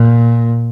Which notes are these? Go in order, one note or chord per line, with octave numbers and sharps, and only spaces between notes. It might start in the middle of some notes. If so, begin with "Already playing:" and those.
Already playing: A#2